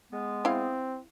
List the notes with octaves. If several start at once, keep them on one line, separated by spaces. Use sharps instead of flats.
G#3 B3
C4 E4 F5